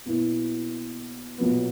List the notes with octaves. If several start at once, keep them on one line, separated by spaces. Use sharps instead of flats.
B1 B2 A#3 E4
B1 A#2 F#3 B3